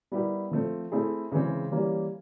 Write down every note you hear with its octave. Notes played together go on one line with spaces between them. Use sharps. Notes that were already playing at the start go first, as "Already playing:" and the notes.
G3 B3 E4 G4 A#4
F3 A3 C4
A3 C4 E4 G#4
C#3 E3 G#3 C4
E3 G3 A#3 C#4